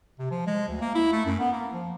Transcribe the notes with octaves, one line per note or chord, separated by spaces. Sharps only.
C3
F3
G#3
D2
A#3
E4
A3
F#2
B3
A#3
F3